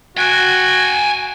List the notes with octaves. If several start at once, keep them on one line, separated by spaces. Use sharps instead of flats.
F#4 G5 G#5